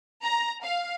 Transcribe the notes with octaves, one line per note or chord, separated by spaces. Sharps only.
A#5
F5